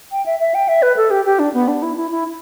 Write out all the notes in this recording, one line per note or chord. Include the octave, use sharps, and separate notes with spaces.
G5
E5
E5
G5
E5
B4
A4
G4
G4
D4
B3
D4
E4
E4
E4